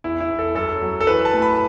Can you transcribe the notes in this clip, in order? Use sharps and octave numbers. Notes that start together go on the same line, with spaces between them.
E2 E4
E4
E2
A4
F#2 A4
F#3
A4
E3 B4
A5
A2
B5